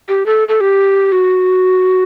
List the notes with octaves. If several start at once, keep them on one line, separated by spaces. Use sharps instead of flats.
G4
A4
A4
G4
F#4